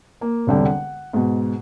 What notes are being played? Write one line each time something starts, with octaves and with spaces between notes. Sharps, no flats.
A#3
E1 C2 D3 G3 G5
F#5
G#2 B2